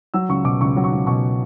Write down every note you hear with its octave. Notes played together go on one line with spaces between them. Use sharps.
F#3 E6
C#2 C#6
B2 D6
C#2 C#6
F#3
C#6
C#2
B2 C#6